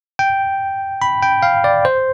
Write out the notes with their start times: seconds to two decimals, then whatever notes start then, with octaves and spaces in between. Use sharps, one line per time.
0.19 G5
1.02 B5
1.22 G5
1.42 F5
1.64 D5
1.85 C5